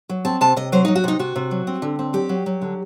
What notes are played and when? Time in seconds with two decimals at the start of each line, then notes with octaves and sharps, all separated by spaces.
0.09 F#3
0.25 C4 A5
0.41 C3 A5
0.56 C3 D#5
0.72 F#3 C5
0.85 D#4
0.88 F#3
0.95 F#4
1.04 C3 D#4
1.19 C3 F#4
1.36 C3
1.51 F#3
1.67 C4
1.82 D3
1.99 C4
2.13 F#3 G4
2.29 F#3
2.46 F#3
2.62 D3